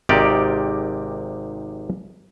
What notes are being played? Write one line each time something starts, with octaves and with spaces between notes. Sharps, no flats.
G#1 C3 D#4 G4 A#4 D5